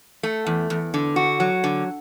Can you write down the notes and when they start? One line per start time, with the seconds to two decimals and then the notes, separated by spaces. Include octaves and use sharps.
0.23 A3
0.46 E2
0.70 E2
0.94 D3
1.16 F#4
1.40 F#3
1.64 D3